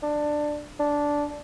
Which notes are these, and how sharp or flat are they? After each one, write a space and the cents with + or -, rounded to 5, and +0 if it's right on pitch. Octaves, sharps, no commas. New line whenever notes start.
D4 +15
D4 -5